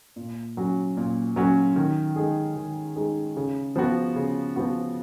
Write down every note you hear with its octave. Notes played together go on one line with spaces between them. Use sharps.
A#2
F#3 C#4 F#4
A#2
F#3 C#4 F#4
D#3
G#3 D#4 G#4
D#3
G#3 D#4 G#4
C#3
F3 B3 F#4
C#3
F3 B3 F#4